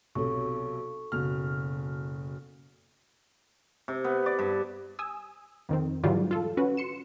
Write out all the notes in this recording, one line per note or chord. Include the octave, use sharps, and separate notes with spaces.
B1 C3 A4 C#6
F#1 B2 F6
C3
B3
D5
G2
G#5 D#6 E6
F2 D#3 C4
G#2 D3 E3 F#3 G3 F4
F4 A4
C#4 F#4 B4
C6 C#7 E7